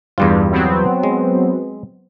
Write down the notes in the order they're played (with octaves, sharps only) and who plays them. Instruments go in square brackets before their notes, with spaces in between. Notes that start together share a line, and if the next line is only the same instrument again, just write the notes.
[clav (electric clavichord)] E2 G3 F4 [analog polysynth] G2
[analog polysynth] F#3 B3 C4
[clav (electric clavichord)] G#3